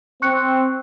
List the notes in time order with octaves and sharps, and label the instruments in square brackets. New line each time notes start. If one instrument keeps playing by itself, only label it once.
[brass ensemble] C4 [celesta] C#6 F#6 C#7